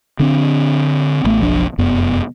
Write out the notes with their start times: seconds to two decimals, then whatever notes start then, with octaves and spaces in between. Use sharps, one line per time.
0.20 D3 C4 D4
1.25 A1 A3 B3
1.39 F#1 B1 F3 D4
1.78 F1 F#2 B3